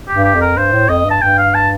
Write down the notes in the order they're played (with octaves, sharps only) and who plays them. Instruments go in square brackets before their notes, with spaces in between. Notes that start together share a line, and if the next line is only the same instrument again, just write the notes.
[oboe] G4
[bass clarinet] G2
[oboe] G4
[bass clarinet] F2
[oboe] A#4
[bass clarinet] G2 [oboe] C5
[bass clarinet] A2
[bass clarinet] F2 [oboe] D#5
[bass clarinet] G2
[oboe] A5
[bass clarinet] G2 [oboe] G5
[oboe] F5
A5